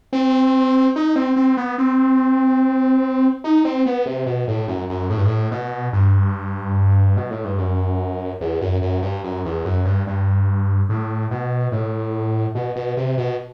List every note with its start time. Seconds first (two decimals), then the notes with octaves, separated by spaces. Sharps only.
0.13 C4
0.96 D#4
1.16 C4
1.36 C4
1.57 B3
1.78 C4
3.44 D#4
3.65 C4
3.86 B3
4.06 C3
4.26 B2
4.48 A2
4.68 F#2
4.89 F#2
5.10 A2
5.18 G2
5.25 A2
5.51 B2
5.93 G2
7.17 B2
7.30 A2
7.45 G2
7.58 F#2
8.41 E2
8.61 F#2
8.82 F#2
9.02 G2
9.24 F#2
9.45 E2
9.65 F#2
9.85 G2
10.07 G2
10.89 A2
11.31 B2
11.72 A2
12.55 B2
12.76 B2
12.97 C3
13.17 B2